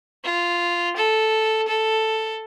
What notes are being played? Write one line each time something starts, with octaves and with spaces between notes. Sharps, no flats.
F4
A4
A4